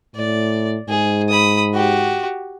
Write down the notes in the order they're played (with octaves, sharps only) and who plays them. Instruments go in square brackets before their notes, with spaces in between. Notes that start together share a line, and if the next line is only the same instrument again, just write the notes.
[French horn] A2 [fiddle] D5
[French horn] G#2 [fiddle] G#4
[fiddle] B5 D#6
F#4 G4